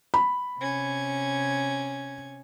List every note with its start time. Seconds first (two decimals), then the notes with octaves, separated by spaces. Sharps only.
0.14 B5
0.60 C3 C#4 G#6